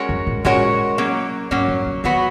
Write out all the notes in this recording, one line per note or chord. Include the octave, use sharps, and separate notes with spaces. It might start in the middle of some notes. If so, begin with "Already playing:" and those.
Already playing: G#3 C#4 F#4 A#4 C#5
F#2
A#2
A#2 G#3 C#4 F#4 A#4 C#5
F#3 A#3 C#4
G#2 F#3 A#3 C#4
F#2
B2
D#3 F#3 B3 F#4 B4